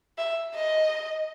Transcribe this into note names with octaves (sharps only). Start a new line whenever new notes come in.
E5
D#5